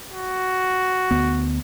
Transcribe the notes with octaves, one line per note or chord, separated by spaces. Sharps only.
F#4
D2 B3